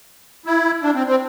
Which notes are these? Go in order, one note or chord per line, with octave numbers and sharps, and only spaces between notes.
E4
D4
C4
C4